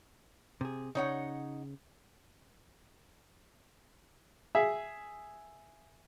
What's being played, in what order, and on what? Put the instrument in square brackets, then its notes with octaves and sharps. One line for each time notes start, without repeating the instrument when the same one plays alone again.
[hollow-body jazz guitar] C3 G#4
[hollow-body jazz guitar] C#3 [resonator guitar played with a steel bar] D#4 C#5 F#5
[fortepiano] G#4 E5